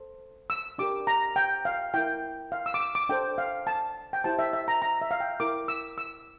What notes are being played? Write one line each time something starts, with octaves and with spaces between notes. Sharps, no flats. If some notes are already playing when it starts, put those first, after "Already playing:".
Already playing: A4 C5
E6
D4 G4 A#4 D6
A#5
G5
F5
E4 A#4 G5
F5
E6
D6
E6
D6
D4 A4 C5 G5
F5
A5
G5
E4 G4 C5 A5
E5
E5
A#5
A#5
E5
F5
G5
E4 A#4 D6
E6
E6